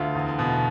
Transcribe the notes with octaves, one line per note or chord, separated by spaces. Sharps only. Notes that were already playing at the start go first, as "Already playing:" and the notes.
Already playing: D2 F4
E2
B2